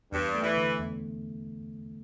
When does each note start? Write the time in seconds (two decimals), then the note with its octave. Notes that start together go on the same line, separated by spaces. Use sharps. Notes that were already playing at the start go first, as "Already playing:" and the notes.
0.12 E2 G2
0.35 A3
0.43 E3
0.57 D3
0.79 E2